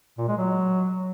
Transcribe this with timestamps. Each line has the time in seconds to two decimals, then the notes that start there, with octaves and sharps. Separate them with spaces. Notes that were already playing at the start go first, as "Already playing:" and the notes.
0.18 A#2
0.28 G#3
0.38 F#3